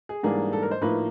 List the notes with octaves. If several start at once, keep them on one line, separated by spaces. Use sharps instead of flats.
G#4
G#2 E3 G3 A#3 D4 G#4
A4
A#4
C5
A2 F3 A#3 D#4 B4